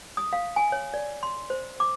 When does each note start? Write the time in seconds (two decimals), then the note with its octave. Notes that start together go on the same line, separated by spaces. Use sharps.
0.17 D#6
0.33 F5
0.56 G#5
0.72 C#5
0.94 D5
1.23 C6
1.50 C5
1.80 D6